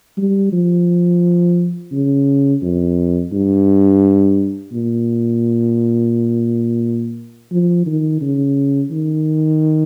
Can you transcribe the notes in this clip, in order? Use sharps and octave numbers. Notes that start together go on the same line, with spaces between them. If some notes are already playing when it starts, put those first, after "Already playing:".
G3
F3
C#3
F2
G2
A#2
F3
D#3
C#3
D#3